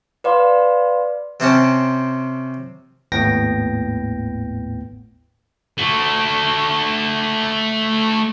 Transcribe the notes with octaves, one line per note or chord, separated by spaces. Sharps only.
B4 D5 F5 C6
C3 C4 C#4 A5
G#1 D#2 A2 B3 G5 A#6
A3 F#4